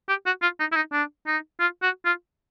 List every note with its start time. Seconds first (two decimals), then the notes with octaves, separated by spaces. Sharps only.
0.09 G4
0.26 F#4
0.42 F4
0.60 D#4
0.72 E4
0.75 D#4
0.92 D4
1.27 D#4
1.60 F4
1.82 F#4
2.05 F4